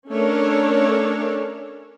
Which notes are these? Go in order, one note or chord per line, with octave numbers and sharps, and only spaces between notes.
A3 C#4 D4 A4 A#4 C#5